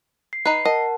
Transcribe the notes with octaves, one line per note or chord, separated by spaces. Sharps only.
C7
D#4 B4 C7
A#4 D#5 F#5 A5